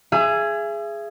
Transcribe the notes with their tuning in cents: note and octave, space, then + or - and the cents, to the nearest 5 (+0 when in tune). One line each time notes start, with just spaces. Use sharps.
G#4 +0 E5 +40